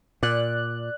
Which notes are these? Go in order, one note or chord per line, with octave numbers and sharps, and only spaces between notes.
A#2 D5 F#6